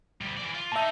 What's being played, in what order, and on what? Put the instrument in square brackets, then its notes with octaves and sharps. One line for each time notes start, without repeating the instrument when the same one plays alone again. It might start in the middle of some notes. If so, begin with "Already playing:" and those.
[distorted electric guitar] D2 G3
E3 D5
F4
[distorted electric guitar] A#3 D#4 [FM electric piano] E5 A5